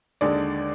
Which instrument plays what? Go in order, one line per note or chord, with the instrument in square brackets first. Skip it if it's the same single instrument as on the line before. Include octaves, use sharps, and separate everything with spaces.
[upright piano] D#2 D3 G#3 D5